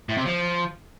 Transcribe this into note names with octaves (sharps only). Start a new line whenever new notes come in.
A2
C3
F3